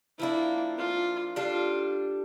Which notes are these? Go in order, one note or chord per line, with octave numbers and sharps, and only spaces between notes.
F3 A#3 D4 E4
F4
G3 D4 F4 A4